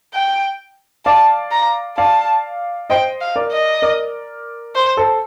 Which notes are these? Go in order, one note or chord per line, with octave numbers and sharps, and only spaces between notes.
G5
D5 F5 A5
A#5
D5 F5 A5
C5 D#5 G5
F5
A#4 D5
D#5
A#4 D5
C5
A4 C5